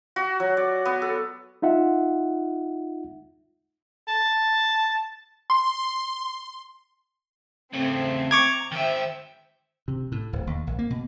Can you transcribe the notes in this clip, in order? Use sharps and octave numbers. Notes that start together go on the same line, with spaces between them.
F#4
F#3
D5
B3
A4
D#4 F4 E5 F#5
A5
C6
C#3 A3 C4 E5
A#5 C#6 D6 G#6
D#3 C5 E5 G5
C3
A2
D1
D#2
A#1
A#3
B2